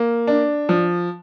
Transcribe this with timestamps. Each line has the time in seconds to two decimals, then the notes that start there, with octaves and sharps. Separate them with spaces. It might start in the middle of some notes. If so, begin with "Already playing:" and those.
Already playing: A#3
0.27 D4
0.69 F3